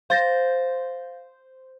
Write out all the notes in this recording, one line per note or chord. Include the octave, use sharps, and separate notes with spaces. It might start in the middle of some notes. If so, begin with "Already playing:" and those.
C5 F5 A6 A#6